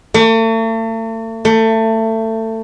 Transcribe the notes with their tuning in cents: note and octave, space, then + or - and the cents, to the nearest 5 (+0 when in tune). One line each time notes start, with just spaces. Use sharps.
A3 +40
A3 +25